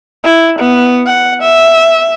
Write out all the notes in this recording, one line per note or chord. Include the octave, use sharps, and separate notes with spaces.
E4
B3
F#5
E5